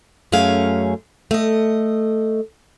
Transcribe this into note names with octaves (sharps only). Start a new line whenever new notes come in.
F#2 A3 C#4 G#4 F5
A3 D#5